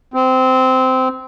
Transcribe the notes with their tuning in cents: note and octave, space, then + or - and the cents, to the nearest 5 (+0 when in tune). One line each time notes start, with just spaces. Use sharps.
C4 -15